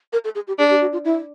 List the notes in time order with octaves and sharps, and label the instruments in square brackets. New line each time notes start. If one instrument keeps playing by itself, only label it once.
[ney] A#4
A4
G#4
G4
[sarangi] D4 [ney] G#4
[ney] G4
F#4
F4
E4